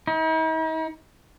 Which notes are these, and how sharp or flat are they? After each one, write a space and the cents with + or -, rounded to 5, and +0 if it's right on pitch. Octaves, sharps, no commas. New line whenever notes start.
D#4 +45